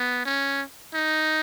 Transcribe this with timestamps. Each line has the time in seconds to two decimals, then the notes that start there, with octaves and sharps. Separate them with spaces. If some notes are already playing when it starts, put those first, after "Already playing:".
Already playing: B3
0.25 C#4
0.95 D#4